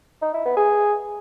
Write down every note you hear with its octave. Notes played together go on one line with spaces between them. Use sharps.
D#4
E4
B3
G#4